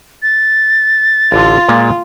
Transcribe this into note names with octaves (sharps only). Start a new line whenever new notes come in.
A6
A1 D3 F4
A#2 G#3 A#3